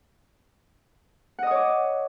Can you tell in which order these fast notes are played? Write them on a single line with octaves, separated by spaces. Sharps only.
F#5 D#5 D#6 C#5 D6